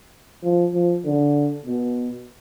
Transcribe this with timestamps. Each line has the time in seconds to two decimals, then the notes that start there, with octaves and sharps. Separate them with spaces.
0.43 F3
0.74 F3
1.04 D3
1.66 B2